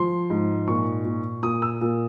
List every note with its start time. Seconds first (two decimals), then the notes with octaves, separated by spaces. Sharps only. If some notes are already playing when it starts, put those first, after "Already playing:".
Already playing: F3 C6
0.30 G#2
0.67 A#2 C#6
1.05 A#2
1.43 A#2 D#6
1.62 E6
1.81 A#2